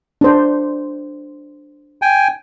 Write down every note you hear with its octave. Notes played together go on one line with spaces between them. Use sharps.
D4 C5
G5 G#5